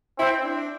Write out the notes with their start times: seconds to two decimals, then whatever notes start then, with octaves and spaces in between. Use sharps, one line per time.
0.18 C4 E4
0.39 C4
0.43 D4